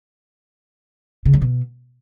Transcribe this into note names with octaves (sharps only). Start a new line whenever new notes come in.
C#3
F#3
B2